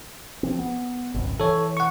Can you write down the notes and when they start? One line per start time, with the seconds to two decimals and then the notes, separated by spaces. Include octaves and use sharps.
0.43 F3 C4
0.59 B3
1.14 G#1 C#2 F#2
1.40 E3 A4 C#5
1.77 F#5 C#6